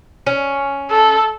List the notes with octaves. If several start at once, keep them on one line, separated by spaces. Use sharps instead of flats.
C#4
A4